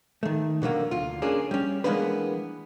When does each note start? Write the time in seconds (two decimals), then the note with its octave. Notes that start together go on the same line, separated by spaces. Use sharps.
0.23 D#3 A3
0.62 B2 D3 F#3 A#3
0.91 D2 F4
1.22 A#3 C#4 D4 G#4
1.51 G3 C#4
1.84 E3 G#3 A#3 B3 D4 B4